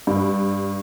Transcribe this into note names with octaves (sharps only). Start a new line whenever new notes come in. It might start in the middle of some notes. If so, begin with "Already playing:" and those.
G2